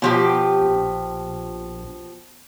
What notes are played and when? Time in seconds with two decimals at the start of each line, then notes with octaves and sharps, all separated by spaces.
0.02 B2 F3 G4
0.61 A#1